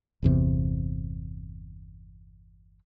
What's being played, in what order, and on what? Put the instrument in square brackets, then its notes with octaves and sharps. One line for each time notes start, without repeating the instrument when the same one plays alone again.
[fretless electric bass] G1 E2 C3